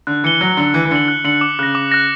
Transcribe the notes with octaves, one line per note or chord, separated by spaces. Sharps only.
D3 F#6
E3 C#7 G7
F#3 F#6
D3 C#7 G7
E3 F#6
E3
D3 C#7 F#7
F#6
D3 C#7 F#7
D6
C#3 F#6 A#6
D6
F#6 A#6